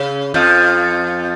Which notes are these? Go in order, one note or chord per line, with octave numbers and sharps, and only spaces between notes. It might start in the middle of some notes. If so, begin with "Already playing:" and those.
Already playing: C#3
F2 F3